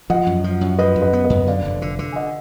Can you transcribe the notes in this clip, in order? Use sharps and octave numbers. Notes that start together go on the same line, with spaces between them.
F3 D#5 F#5
F#2
F3
F#2
F3 B4 D#5
F#2
B4 D#5
B3
B4 D#5
F#2
D3 D5 F5
F1
D3
D3
G#5
D#5 F#5